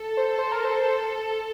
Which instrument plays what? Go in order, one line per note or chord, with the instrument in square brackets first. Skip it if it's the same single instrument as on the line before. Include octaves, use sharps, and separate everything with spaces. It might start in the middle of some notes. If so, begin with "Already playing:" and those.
Already playing: [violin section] A4
[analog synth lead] C5
C5
A#4
C5